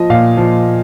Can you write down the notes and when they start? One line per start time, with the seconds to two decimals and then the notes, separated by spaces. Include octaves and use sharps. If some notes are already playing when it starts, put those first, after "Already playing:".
Already playing: F3 D#5
0.10 A#2 F5
0.37 F3